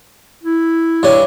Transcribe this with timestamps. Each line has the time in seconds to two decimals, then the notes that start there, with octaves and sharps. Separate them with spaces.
0.43 E4
1.03 G2 C#4